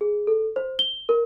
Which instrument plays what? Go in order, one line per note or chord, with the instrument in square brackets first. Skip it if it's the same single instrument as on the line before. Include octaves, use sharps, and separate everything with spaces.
[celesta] G#4
A4
C5
G7
A#4